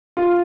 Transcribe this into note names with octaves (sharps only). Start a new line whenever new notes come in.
F4